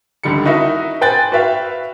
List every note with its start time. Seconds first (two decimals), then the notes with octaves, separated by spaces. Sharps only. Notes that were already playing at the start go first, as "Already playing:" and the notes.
0.23 C#2 D3 D#3 G3 C#7
0.45 D#4 E4 F#4 A#4 D#5 E5
1.01 B4 C5 G5 G#5 F#6 A6
1.32 F#4 B4 E5 F5 G5